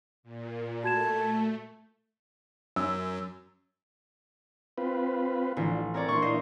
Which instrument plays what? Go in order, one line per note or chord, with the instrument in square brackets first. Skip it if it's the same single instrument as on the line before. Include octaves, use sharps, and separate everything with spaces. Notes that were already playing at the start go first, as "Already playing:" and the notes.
[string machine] A#2
[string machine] A3 [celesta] F#4 G#6 E7 [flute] A5
[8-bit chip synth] F#2 [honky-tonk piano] E6
[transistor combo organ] C4 F4 B4
[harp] A1 [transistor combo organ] D3 F3
[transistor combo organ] C4 [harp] A#4 C#5 D5
[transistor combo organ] A#2 E3 D4 [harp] C6 C#6
[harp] C5 D#5 F5